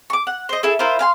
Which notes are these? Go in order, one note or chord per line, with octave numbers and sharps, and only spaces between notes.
C#6 D6
F#5
C5 D#5
E4 G#4 A4
E4 F4 A#4 C5
F5 G#5 C6